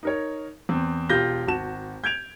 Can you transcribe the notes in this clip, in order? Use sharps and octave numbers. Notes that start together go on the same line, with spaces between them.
D#4 A#4 C#5
E2 C4
E1 F4 G4 G6 A#6 G7
G#1 F#4 A5 E7
G6 G#6 D7 F7